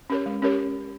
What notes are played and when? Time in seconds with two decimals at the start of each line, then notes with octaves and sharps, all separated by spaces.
0.10 C#4 G4 A#4 C#5
0.26 G#3
0.42 C#4 G4 A#4 C#5